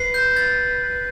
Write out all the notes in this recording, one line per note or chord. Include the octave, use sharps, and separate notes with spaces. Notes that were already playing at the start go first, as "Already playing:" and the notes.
Already playing: B4 C7
G6
A6